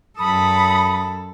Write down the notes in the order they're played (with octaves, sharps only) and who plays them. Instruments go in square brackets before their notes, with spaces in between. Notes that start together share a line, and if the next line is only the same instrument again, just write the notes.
[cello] F#2 A4 [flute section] B5 D#6